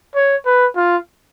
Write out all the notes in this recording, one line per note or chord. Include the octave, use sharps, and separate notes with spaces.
C#5
B4
F4